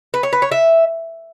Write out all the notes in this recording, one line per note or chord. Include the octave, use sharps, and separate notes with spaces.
B4
C#5
B4
C#5
E5